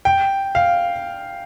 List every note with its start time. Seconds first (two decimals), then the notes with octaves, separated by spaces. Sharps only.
0.05 G5
0.55 F5